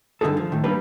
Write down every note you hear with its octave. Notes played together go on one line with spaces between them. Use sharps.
G2 D3 C4 D#4 G#4 A4
F3
A2 D#3
G3 A#3 D4 B4